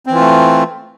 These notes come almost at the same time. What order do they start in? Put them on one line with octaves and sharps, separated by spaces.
C4 E3 F4 A3